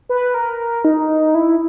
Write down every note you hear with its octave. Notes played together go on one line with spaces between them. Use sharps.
B4
A#4
D#4
E4